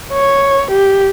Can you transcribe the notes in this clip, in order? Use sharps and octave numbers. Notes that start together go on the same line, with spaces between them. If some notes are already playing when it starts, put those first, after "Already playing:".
C#5
G4